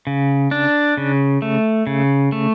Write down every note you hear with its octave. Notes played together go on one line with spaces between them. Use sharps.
C#3
D4
C#3
A3
C#3
A3